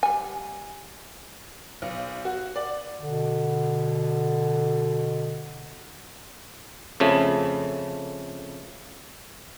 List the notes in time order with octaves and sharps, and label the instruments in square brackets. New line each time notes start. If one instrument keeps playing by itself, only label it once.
[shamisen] G3 G#5
[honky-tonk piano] B1
F#4
D5
[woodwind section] B2 D3
[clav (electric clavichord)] F2 C#3 A3